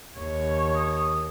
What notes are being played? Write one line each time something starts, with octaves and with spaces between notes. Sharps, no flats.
D#2 C#5
D#6